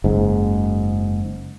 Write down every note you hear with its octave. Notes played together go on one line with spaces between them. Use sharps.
F#1 G#2